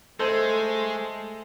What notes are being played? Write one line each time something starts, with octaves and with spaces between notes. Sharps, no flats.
G#3 A3 A4 C5